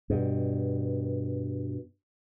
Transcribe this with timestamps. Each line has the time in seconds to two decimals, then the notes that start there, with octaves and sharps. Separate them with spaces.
0.10 G2 B2